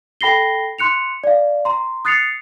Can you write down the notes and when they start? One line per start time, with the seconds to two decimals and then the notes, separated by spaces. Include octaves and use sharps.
0.21 A4 G5 B5 A#6 C7 G7
0.78 C6 F#6 C#7 F7
1.24 D5 F5
1.65 A#5 C6
2.05 D#6 F#6 A6 C7 C#7 F7